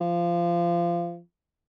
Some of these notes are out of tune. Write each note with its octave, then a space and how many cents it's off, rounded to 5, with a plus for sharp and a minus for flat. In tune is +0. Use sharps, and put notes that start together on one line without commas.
F3 -20